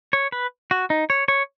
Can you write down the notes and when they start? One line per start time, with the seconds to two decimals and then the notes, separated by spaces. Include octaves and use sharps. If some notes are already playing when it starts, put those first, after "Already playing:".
0.13 C#5
0.32 B4
0.71 F#4
0.90 D#4
1.10 C#5
1.28 C#5